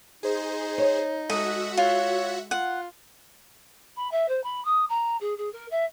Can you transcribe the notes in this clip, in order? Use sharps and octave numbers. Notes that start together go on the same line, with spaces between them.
D#4 G#4 C5
C#5
G#3 F#4 A4 D#5 E5 F#5
F4 C#5
F4 F#5
B5
E5
C5
B5
D#6
A#5
G#4
G#4
A#4
E5